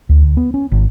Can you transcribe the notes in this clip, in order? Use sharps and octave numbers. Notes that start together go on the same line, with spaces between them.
D2
D2
B3
C#4
G#1